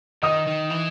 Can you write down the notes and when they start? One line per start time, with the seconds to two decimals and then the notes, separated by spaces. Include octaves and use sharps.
0.22 D#3 D#5 D#6
0.47 D#3
0.71 E3